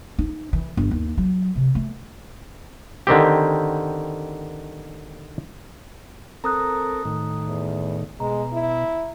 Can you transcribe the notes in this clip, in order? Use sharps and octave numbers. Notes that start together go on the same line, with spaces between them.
D#4
E3
G1
D#2
F#3
C3
A3
D3 D#3 C4 G4
C4 A4 A#4 A#5 D#6 F#6
A2 D#3
E2
B2 G#3 A#5
E4